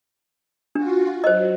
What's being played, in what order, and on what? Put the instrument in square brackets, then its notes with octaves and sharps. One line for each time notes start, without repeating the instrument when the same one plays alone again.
[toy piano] D4 [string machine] F4 F#4
[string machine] F#3 [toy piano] C5 D#5